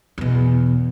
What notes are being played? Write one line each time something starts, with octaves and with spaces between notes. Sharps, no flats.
E2 B2